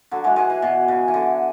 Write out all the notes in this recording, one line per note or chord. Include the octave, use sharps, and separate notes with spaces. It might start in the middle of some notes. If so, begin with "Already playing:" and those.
D3 F#3
E3 G#3
E3 G#3
E3
B2
C#3
E3
D3